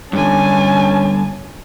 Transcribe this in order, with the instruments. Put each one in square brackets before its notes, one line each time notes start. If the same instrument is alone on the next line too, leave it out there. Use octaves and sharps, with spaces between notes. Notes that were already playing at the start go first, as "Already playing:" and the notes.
[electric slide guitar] G2 D3 [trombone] C#4 [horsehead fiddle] G#5 A5